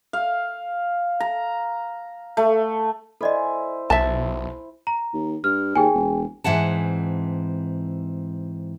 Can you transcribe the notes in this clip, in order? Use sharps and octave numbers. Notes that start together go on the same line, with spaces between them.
F5
A#5
A3
E4 A4 C5 D5 D#5 G#5
B1 E5 A5
A#5
D#2
G2 F6
D#2 G#4 G5 G#5
E1
G#2 E3 C4 F#5 A5